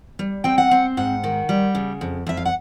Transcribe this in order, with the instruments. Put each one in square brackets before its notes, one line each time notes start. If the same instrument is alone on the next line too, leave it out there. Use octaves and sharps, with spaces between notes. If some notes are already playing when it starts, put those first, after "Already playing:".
[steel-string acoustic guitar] G3
C4 G5
F#5
C4
G#2 F#5
D#3
G3
C#3
F2
F2 E5
F5
F#5